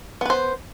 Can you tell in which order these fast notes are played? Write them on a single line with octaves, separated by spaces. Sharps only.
B3 B4 C5